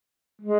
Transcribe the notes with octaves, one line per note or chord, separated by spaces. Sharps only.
G#3